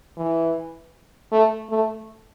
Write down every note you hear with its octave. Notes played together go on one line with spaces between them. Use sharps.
E3
A3
A3